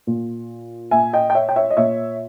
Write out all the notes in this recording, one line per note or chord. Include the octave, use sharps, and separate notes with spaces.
A#2
A#2 E5 G#5
D#5 G5
G5
C#5 E5
G5
C#5 E5
D#5
A#2 C#5 E5